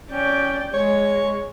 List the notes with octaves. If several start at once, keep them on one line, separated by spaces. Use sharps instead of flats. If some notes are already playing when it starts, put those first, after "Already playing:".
C#4 D5 G5
G#3 C#5